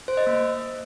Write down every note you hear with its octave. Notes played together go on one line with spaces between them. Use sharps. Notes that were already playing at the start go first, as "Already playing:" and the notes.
C5
D#5
A#3